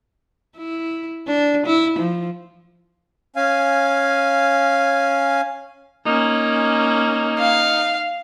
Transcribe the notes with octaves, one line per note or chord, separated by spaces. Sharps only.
E4
D4
E4
F3
C#4 F5 G#5
A#3 C#4 D#4
F5